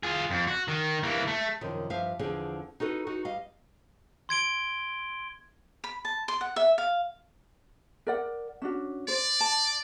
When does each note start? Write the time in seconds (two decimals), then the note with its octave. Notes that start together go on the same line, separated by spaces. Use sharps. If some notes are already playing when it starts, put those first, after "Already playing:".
0.03 F4 G#4
0.31 F2
0.48 F#4
0.68 D#3
1.03 E3 A#3
1.27 A3
1.61 F#2 C3 D#3 F3
1.90 G2 F3 E5 F5
2.19 E2 D3 F3 C4 G#4
2.80 D#4 F#4 A4 B4
3.07 D#4 F#4
3.25 G3 D#5 F5
4.29 C6 G#6 D7 G7
5.84 B5
6.05 A5
6.28 C6
6.41 F#5
6.56 E5
6.78 F5
8.07 A#4 D5 F#5
8.62 C#4 D4 F#4
9.08 C5 D5
9.41 A5